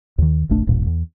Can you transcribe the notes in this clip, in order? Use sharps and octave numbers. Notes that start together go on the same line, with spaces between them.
D#2 D#3
F1 A#1 A3 D4
D#1 A1 G2 A#2
E2